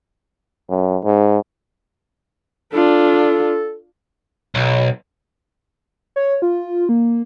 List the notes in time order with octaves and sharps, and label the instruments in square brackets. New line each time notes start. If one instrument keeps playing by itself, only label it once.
[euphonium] F#2
G#2
[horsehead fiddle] D4 F4 [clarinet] A4
[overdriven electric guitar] B1
[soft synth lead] C#5
F4
A#3